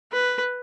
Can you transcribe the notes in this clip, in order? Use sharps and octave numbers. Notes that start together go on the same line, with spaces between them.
B4